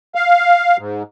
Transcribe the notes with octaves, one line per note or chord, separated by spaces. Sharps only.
F5
G#2